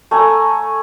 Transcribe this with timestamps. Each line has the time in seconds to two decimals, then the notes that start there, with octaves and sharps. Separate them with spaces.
0.11 A3 G#5 A#5